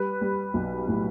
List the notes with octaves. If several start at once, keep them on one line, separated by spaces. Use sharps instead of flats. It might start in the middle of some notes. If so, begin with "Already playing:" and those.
Already playing: G3 B4
G3
B1
A2